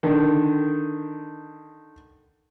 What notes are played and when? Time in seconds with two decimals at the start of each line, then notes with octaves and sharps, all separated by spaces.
0.03 D3 D#3